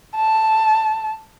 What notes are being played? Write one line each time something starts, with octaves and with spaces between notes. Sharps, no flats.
A5